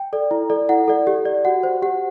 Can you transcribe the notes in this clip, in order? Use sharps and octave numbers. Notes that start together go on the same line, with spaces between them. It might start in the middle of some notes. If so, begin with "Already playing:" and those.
Already playing: G5
A4 D5
E4
A4 D5
E4 F#5
A4 D5
G4
D5
F#4 F#5
C5
G4 F#5